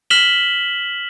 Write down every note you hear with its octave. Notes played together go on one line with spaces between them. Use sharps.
F6 B6 E7 F#7 G7